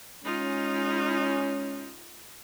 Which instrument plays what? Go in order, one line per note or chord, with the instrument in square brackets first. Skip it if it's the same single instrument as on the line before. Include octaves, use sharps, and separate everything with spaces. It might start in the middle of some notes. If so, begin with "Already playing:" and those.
[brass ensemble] G#3 C#4 [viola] D#4 F4